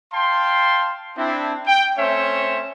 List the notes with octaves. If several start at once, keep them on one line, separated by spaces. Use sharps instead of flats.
F5 G5 A5 C6
C4 D4 E4
G5
A3 C4 C#4 C5 C#5 E5